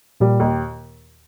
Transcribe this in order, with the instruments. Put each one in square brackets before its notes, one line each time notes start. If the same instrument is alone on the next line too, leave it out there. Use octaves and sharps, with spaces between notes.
[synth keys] A#2 [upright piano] G3
[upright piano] D#2